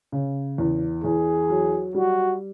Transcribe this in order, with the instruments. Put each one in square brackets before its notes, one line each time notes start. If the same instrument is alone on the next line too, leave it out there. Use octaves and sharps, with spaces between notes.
[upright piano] C#3
E2
[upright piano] E2 [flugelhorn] G#4
[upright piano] F#3
[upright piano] G3 [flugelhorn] F#4